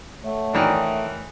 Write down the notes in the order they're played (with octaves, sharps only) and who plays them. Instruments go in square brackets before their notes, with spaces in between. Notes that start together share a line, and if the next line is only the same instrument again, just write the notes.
[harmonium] A3 [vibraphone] C#5 E5 F#5
[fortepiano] D#3 E3 D4